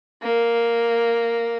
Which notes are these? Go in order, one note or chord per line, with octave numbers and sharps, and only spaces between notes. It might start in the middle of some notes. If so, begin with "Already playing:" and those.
A#3